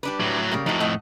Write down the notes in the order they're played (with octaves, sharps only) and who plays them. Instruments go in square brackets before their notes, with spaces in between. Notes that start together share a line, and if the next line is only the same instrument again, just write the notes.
[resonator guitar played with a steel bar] G3 D4 B4
[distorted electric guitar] A2 F#3
[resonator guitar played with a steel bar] C#3 G3 A#3
[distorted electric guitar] F2 A2 [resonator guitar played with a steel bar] D#4 F#4
[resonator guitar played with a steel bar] A3 D#5 F#5